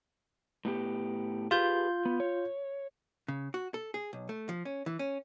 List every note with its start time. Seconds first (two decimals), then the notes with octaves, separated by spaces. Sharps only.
0.65 A2 B3 G4
1.51 F4 G4 G#4 B4 G6
2.05 B3
2.20 C#5
3.28 C#3
3.54 F#4
3.74 A4
3.94 G#4
4.13 B1
4.29 A3
4.49 F3
4.65 C#4
4.86 E3
4.99 C#4